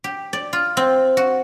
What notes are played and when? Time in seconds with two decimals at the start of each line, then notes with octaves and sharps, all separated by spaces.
0.04 G4
0.33 D5
0.53 F4
0.77 C4
1.17 F#4